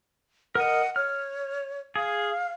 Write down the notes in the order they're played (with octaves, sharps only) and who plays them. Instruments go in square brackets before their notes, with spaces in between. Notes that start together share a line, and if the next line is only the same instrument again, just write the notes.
[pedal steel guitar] A#4 D#5 [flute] F#5
[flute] C#5 [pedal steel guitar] F6
[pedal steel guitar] G#4 [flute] F5